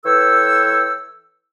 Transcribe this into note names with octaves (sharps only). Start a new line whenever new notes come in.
E3 A4 B4 C#5 G5 E6